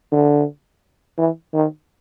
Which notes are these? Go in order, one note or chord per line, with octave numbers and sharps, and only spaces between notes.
D3
E3
D#3